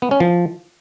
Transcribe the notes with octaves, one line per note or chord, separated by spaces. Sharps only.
B3
C#4
F3